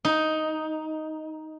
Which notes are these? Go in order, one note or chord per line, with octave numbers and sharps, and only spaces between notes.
D#4